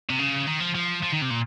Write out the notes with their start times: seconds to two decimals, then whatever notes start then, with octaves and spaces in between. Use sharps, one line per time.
0.09 C3
0.19 C#3
0.47 D#3
0.60 F3
0.75 F3
1.03 F3
1.12 D#3
1.22 C3
1.30 A#2